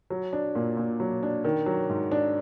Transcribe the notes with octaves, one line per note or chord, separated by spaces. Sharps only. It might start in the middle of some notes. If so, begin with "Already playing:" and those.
F#3
D4
A#2
A#2
F#3
D4
D#3
F#3
G#2
D4